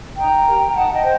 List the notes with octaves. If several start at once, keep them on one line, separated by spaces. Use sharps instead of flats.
D#4 G5 A#5
G4 A#4
D#4 F#5 A5
D#5 G5
C5